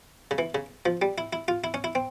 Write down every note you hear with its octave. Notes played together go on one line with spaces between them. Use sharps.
C#3
E3
C#3
F3
G3
E4
E4
F4
E4
C#4
E4
C4